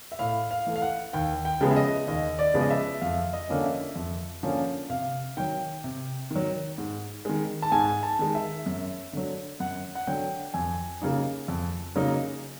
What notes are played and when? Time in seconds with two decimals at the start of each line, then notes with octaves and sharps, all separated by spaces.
0.12 E5
0.19 A2 F5
0.51 F5
0.66 E3 A3
0.76 F5
0.82 F#5
1.13 D#2 G5
1.45 G5
1.61 C#3 F3 G#3 B3
1.71 E5
1.76 D#5
2.08 D#2 D#5
2.39 D5
2.54 C#3 F3 G#3 B3
2.61 D#5
2.70 E5
3.01 F2 F5
3.33 D#5
3.49 D3 F3 A#3 C#4
3.64 E5
3.96 F2
4.43 D3 F3 A#3 C#4
4.90 C3 F5
5.37 D#3 F#3 G5
5.84 C3
6.31 D#3 F#3
6.78 G#2
7.25 D#3 G#3
7.62 A5
7.72 G#2 G#5
8.03 A5
8.19 D#3 G#3
8.35 E5
8.66 F#2
9.13 D3 F#3
9.60 F#2 F#5
9.95 F#5
10.07 D3 F#3 G5
10.54 F2 G#5
11.02 C#3 F#3 A#3 D#4
11.48 F2
11.95 C#3 F#3 A#3 D#4